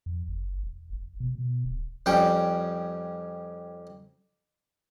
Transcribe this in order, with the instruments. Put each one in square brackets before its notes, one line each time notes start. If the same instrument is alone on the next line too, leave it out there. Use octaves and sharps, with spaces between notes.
[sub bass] F2
F#1
E1
F1
B2
B2
D1
[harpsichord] F2 G3 C#4 G5